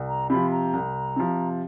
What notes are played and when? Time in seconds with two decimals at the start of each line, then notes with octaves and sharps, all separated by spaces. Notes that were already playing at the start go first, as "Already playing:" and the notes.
Already playing: C2
0.08 A#5
0.30 C3 F3 B5
0.51 A#5
0.73 C2
1.16 C3 F3